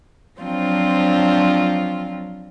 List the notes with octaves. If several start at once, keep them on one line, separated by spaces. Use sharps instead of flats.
F3 F#3 C4 D4 F4